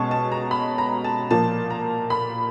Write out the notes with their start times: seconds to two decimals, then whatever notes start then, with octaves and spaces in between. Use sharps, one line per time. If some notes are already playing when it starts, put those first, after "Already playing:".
Already playing: B2 G#3 C#4 A5 C#6
0.11 A5
0.32 A#5
0.51 B5
0.78 A#5
1.04 A5
1.31 A#2 F3 A#3 A5
1.70 A#5
2.10 B5